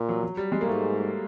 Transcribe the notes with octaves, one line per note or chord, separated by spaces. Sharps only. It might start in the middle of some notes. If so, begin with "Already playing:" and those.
Already playing: A#2
F#3
F#3
G3
G#3
A#3
G#2 A3